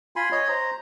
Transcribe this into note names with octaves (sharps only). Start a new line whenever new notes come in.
F4 G#5 B5 C6
C#5 D#5
C5 A#5